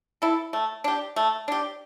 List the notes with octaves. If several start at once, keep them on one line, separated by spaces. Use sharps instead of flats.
E4 A4
A3
D4 G4
A3
D4 G4